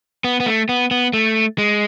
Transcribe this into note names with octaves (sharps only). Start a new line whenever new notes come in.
B3
B3
A3
B3
B3
A3
G#3